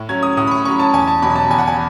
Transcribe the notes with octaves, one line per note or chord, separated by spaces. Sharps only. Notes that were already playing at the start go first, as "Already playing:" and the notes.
Already playing: A2
F#3 C#4 G#6
D#6
A2 D#6
B5
C#6
F#3 C#4 C#6
A5
E2 G#5
A5
B2 F#3 B5
A5
E2 G#5
F#5
G#5